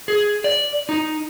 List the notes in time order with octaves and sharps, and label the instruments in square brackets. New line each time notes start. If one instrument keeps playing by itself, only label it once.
[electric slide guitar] G#4
D5
D#4